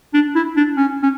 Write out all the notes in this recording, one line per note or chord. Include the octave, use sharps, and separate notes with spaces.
D4
E4
D4
C#4
C#4